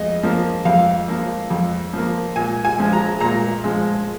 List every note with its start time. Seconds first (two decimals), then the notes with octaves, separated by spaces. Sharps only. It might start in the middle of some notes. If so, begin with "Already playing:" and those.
Already playing: F2 G#4 D#5
0.23 F3 A#3
0.65 F2 F5
1.08 F3 A#3
1.50 F2
1.93 F3 A#3
2.36 A#2 G#5
2.65 G#5
2.78 F3 G#3
2.93 A#5
3.20 A#2 A#5
3.64 F3 G#3